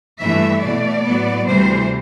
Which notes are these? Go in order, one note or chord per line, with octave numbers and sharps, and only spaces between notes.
G2 E3 A3 E5
B2 A3 D5
A2 F#3 B3
D2 C3 E3 G3 C5